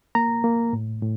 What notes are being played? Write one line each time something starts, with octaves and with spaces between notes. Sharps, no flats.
A#3 A#5
A#3
A2
A2